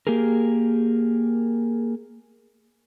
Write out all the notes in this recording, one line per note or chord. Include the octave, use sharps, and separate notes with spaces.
A#3 G4 G#4 A#4